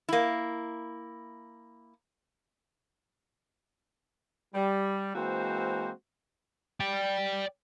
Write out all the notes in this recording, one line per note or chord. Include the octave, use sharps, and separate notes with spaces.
A#3 E4
G3
E3 G#3 A#3 C4 F#4 C5
D5 G5